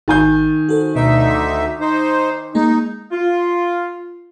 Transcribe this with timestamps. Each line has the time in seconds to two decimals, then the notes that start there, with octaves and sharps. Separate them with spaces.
0.08 G#1 D#3 G#5 G6 A6
0.69 F#4 A4 C5
0.96 D2 B2 D#4 B4 E5
1.30 C6 D6
1.81 D#4 C5
2.55 G#3 A#3 D#4 G#4
3.12 F4